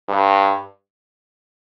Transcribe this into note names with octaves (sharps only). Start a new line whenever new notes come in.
G2